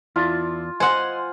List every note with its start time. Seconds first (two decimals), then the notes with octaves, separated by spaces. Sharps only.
0.16 E2 E4 F4 D5 A5
0.80 C5 D#5 F#5 G#5 C6